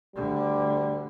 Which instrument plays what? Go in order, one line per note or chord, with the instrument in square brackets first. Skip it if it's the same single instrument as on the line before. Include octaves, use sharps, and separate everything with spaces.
[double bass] D2 D3 [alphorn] G3